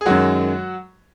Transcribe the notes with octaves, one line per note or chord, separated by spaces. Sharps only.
G#4
F#2 D#3 F#3 G#3 F#4